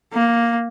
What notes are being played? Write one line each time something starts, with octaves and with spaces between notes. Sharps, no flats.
A#3